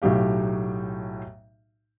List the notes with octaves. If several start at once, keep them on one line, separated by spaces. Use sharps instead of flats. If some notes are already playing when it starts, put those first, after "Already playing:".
B1 A2 F#3 G4 F5